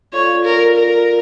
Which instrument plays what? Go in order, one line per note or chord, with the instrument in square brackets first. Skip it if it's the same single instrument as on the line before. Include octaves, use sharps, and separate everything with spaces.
[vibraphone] F4 A4 D5 F5 [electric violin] C#5
[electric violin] A#4
A#4